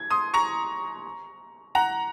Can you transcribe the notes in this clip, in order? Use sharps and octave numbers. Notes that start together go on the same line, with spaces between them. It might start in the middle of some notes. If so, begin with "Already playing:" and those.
Already playing: G#6
C6 D#6
A#5 C#6
F#5 A#5